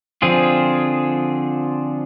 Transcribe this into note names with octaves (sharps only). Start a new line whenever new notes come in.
D3 F3 C4 F4 G#4